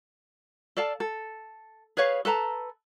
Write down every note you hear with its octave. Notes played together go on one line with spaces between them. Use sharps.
A4 D5 F5 A5
A4
G#4 B4 C#5 F5
A4 B4 A5 A#5